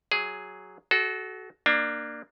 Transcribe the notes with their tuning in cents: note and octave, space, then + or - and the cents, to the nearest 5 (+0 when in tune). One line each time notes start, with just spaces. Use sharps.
F#3 +5 G#4 +0
F#4 +15 A4 -30
A#3 +0 D4 +20